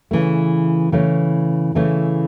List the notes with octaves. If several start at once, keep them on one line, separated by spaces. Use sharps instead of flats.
C#3 E3 A3
C#3 E3 A3
C#3 E3 A3